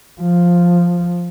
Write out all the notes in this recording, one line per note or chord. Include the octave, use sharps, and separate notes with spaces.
F3